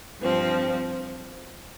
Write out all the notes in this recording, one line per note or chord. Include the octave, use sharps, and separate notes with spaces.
G2 F3 C4